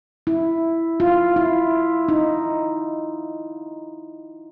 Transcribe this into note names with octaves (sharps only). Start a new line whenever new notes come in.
E4
F4
E4
D#4